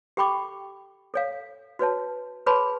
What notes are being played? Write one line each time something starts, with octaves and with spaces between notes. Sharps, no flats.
G4 A4 G5 B5 C#6 D6
A4 C#5 F5
F#4 B4 C#5 A5
G#4 B4 C#5 A5 B5 C6